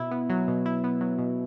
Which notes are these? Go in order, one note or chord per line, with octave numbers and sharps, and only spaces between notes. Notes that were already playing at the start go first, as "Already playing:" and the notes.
Already playing: B2 E4
B3
F#3
B2
E4
B3
F#3
B2